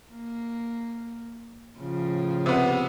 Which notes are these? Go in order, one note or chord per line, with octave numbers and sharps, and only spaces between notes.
A#3
A2 C#3 F3
C3 B3